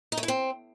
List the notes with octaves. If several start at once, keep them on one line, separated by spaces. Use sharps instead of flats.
D#4
A3
E4
C4